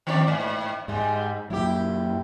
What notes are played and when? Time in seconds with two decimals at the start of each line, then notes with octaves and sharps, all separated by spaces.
0.07 D#3 C4 D5
0.27 G#2
0.88 G#2 G3 G#3
1.50 F#2 A#2 F#3 E4 G4